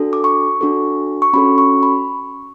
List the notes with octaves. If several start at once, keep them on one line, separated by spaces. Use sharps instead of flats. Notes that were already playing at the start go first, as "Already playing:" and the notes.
Already playing: D4 F#4 A4
D6
C#6
D4 F#4 A4
C#6
C#4 F#4 A4 B5
C#6
B5